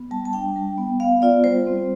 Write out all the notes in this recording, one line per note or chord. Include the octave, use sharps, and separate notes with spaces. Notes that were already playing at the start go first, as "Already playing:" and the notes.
Already playing: B3
G3 A5
A5
D4 G5
G3
B3
B3 F5
F4 D5
G3 C5
C4